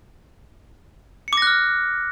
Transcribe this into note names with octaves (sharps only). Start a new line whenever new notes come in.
D6 F6 F#6 A#6 C#7